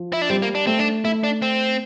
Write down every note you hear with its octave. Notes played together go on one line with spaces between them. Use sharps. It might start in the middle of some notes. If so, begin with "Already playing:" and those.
Already playing: F3
E4
D4
G3 C4
A#3
D4
A3 C4
D4
A3 E4
D4
C4